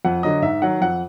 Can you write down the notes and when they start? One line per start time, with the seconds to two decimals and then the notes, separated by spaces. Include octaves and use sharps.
0.05 F2 F#5
0.23 D3 F#3 D#5
0.42 G#2 E5
0.62 D#3 F#3 F#5
0.81 F2 F#5